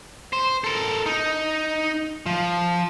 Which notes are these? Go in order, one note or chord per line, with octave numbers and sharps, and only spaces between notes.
C5
A4 A#4
D#4
F3